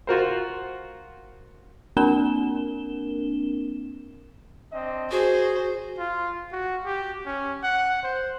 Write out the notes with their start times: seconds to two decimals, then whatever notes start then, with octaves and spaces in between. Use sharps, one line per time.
0.07 F4 F#4 A#4 C5
1.97 A#3 C4 D4 A#4 E7 G7
4.72 C4 D4 D#5
5.11 F#4 G#4 C5
5.99 F4
6.52 F#4
6.85 G4
7.26 C#4
7.63 F#5
8.03 C5